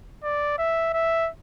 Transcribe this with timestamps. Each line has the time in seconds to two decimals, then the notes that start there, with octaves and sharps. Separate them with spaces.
0.24 D5
0.58 E5
0.93 E5